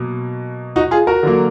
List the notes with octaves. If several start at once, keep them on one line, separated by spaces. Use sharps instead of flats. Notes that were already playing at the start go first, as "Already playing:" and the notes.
Already playing: B2 F#3 A#3
D#4 F#4
F4 G#4
F#4 A#4
D3 F#3 A#3